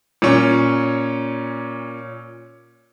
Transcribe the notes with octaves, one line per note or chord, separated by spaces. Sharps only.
A#2 C#4